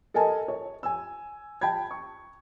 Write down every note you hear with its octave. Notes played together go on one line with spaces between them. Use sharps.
A4 A#4 D#5 G#5 A5
C#5
G#5 E6
G5 A5 B5 G#6
C#6